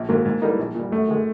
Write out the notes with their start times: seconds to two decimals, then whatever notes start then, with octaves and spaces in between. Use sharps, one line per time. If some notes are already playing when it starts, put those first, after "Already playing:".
Already playing: A#1
0.09 G#2 D#3 F#3 A#3
0.25 G#2
0.42 E3 G3 A#3 D#4
0.59 A#1
0.75 A#2 G3
0.92 F#2 A3
1.09 D#3 G#3